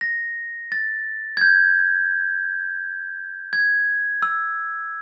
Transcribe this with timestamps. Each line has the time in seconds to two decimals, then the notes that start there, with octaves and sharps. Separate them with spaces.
0.01 A#6
0.72 A6
1.37 G#6
1.41 G6
3.53 G#6
4.22 E6